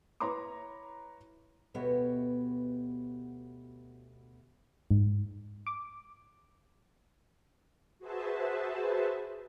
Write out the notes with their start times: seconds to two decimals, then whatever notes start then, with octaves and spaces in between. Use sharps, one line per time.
0.20 E4 B4 C#5 A#5 C6 D6
1.74 D2 B2 B3 G4 C#5 D#5
4.91 G#2
5.67 D6
7.99 F#4 G#4 B4 C5 E5 A5